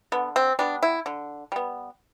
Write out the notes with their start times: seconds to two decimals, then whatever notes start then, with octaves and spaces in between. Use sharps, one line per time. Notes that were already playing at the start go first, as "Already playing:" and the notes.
0.12 D3 B3
0.36 C4
0.59 G3 B3 D4
0.83 E4
1.06 D3
1.52 G3 B3